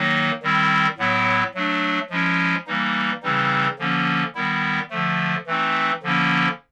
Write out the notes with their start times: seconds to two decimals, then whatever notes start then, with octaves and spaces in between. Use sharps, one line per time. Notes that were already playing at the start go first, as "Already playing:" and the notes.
Already playing: D#3 F#3 A#3 D#4
0.43 D#3 G3 C4 E4
0.98 A2 F#3 B3 E4
1.55 F#3 A3 D4
2.10 F3 G#3 C#4 E4
2.67 E3 G3 A#3 D#4
3.23 C#3 E3 G3 C4 D#4
3.79 D3 F3 A#3 C#4
4.35 D#3 G3 B3 E4
4.90 D3 F3 A3
5.47 E3 A3 C4 D#4
6.03 D3 F3 A#3 C#4 E4